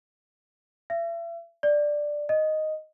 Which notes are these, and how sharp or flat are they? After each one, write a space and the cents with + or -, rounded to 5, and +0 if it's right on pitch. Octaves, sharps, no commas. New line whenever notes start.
E5 +40
D5 +5
D#5 +0